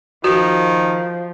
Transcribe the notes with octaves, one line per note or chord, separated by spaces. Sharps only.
D#3 F3 F#4